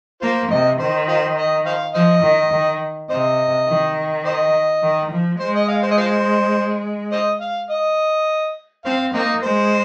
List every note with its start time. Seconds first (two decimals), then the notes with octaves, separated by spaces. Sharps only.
0.22 A#3 F4 C5
0.51 C3 D#5
0.79 D#3 C5
1.08 F4 C5
1.37 D#5
1.66 C5 F5
1.94 F3 C5 D#5
2.23 D#3
2.53 D#3
3.09 C3 C5 D#5
3.67 D#3
4.25 C5 D#5
4.82 D#3
5.11 F3
5.39 G#3 C5
5.55 D#5
5.68 F5
5.83 C5
5.91 D#5
5.98 F4 C5
7.12 C5 D#5
7.41 F5
7.70 D#5
8.85 C4 C5 F5
9.14 A#3 C4 D#4
9.43 G#3 C5